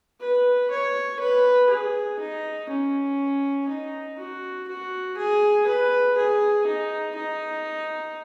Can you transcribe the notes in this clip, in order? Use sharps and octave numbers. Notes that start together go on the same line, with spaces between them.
B4
C#5
B4
G#4
D#4
C#4
D#4
F#4
F#4
G#4
B4
G#4
D#4
D#4